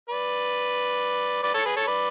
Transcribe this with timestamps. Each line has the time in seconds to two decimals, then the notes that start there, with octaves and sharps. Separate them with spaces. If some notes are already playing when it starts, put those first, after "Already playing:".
0.10 B4 D5
1.43 B4 D5
1.54 A4 C#5
1.65 G#4 B4
1.76 A4 C#5
1.87 B4 D5